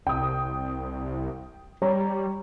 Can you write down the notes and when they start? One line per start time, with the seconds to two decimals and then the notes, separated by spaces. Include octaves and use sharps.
0.07 C2 G5 D#6
1.82 G3 C#5 A#5